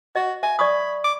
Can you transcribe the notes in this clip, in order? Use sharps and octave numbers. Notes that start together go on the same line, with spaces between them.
F#4 D#5
E5 G#5
D5 B5 C#6 D#6
D6